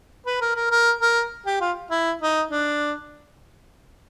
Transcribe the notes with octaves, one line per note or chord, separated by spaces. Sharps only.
B4
A#4
A#4
A#4
A#4
G4
F4
E4
D#4
D4